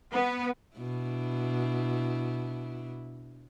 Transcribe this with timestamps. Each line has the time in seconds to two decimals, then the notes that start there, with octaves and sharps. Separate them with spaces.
0.12 B3
0.77 B2 D4 E4